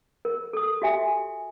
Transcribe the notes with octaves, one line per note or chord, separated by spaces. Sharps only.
A#4
A4 D#6
F#4 G4 E5 G#5